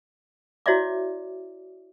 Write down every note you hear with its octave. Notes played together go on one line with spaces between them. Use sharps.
E4 F#4 C#5 D5 E5 D6